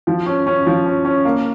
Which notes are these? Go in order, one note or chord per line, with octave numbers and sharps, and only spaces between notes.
F3
C#4
C#4
F3
C#4
C#4
A#3